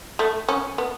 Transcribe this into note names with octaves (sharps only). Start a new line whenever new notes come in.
A3
C#4
B3